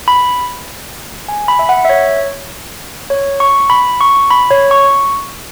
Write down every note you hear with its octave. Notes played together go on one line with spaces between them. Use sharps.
B5
G#5
B5
E5
F#5
E5
C#5
C#5
C#6
B5
C#6
B5
C#5
C#6